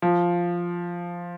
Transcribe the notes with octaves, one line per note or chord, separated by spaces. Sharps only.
F3